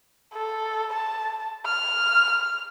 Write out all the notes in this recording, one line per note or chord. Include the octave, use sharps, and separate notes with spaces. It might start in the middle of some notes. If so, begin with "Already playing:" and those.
A4
A5
F6